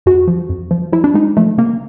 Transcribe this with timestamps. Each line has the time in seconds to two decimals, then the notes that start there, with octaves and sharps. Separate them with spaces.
0.06 F2 F#4
0.28 F3
0.49 F2
0.71 F3
0.92 F3 E4
1.04 D4
1.14 G#3 D#4
1.37 F3 A3
1.58 C#3 A#3